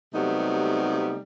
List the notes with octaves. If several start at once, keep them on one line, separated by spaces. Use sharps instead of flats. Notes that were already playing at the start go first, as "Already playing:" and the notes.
C3 F#3 G3 A3 B3 D#4